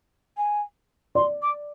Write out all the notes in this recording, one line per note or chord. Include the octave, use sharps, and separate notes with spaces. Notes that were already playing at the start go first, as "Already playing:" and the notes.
G#5
D5 C6
D6